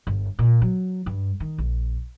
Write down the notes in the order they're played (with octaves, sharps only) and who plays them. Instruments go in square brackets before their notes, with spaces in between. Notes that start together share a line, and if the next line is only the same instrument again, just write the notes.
[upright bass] G1
A#2
F#3
G2
D#3
A#1